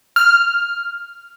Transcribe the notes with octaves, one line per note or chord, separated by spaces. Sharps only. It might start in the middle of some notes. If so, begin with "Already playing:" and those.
F6